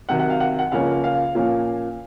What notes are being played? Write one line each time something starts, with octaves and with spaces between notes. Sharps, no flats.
C3 D#3 F#3 F#5
F#5
F5
F#5
F#5
C#2 C#3 F3 A#3 C#4 F5
F5
A#2 F3 A#3 C#4 F5